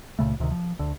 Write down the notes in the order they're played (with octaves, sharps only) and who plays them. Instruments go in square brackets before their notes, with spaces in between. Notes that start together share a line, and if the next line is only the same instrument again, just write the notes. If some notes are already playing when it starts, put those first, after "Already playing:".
[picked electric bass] C#2 A#2 C#3 A3
D2 C3 D#3
F3
D2 D3